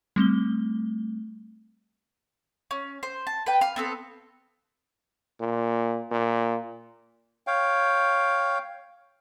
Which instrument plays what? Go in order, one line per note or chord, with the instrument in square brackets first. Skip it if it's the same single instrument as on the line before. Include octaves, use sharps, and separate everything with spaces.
[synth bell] G3 A3 C4 G7
[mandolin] C#4
C5
A5
B4 G5
F5 F6
B3 C4 A4
[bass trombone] A#2
A#2
[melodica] C#5 F5 G5